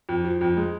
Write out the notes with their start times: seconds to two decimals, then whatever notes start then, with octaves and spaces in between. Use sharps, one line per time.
0.09 F2
0.25 F3
0.41 F2
0.57 G#3